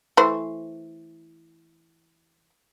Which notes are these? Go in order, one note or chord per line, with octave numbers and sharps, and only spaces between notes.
E3 A3 C5